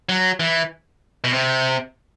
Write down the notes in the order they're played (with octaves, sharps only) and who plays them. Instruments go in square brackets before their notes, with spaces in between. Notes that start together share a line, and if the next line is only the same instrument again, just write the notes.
[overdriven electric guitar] F#3
E3
B2
C3